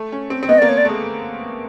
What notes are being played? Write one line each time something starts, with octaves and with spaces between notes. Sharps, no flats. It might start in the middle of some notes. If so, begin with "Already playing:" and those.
Already playing: A3
C#4
C4
C4
B3 D#5
A#3 D5
C#5
D5
A3
G#3